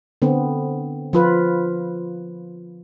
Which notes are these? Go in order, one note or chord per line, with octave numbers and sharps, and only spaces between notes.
D3 B3 C4
F3 F4 B4